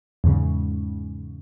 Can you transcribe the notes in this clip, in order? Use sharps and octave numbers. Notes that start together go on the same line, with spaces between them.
E2 G#2 C#3